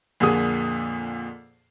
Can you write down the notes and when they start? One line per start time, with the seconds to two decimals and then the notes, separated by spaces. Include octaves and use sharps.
0.20 F2 A#2 D3 A#3 G#4 D#6